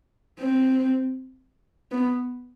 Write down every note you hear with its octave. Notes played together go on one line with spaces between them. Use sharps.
C4
B3